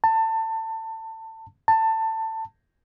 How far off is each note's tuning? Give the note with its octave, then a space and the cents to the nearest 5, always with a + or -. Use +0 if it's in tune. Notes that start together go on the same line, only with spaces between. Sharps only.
A5 +25
A5 +20